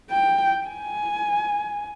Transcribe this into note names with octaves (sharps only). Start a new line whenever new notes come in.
G5
G#5